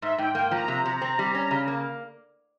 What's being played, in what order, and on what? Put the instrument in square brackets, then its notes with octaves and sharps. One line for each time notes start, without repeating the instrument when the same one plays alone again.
[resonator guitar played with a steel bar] G#2 [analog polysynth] E5
[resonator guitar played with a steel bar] G#2 [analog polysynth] G5
[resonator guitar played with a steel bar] A#3 [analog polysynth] G5
[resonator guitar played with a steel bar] F3 [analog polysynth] A#5
[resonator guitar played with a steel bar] C3
C3
C4
G3
C#4
C#3
A#3